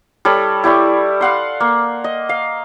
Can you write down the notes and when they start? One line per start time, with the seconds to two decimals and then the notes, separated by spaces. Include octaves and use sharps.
0.25 G3 A4 C#5 B5
0.64 E4 G4 D5 C#6
1.21 F5 F#5 C6
1.60 A#3
2.04 D#5
2.29 F5